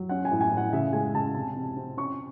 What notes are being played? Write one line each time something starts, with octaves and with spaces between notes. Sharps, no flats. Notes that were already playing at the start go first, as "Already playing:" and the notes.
Already playing: F#3
C#4 F#5
G#5
A2
G#5
A2
F#5
C#3 E5
G#3 G#5
C#3 A5
C3 A5
C3
C4
C#4 C#6